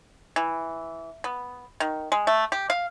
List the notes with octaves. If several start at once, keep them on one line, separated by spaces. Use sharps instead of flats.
E3
B3
D#3
G#3
A3
G4
F5